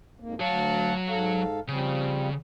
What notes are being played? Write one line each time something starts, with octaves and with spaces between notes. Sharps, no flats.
F2 G#2 A#3
D2 F#3 C#5 F5 A5
G#2 A4 F5
C#3 F3 G3 C4